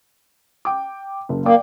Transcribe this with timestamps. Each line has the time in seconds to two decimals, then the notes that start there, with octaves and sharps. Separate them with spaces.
0.65 G5 D6
1.29 F#1
1.46 A#3 D5 G5 D6